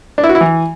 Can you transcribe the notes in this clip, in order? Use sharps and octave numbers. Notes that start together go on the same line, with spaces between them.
D4
E4
F#4
E4
E3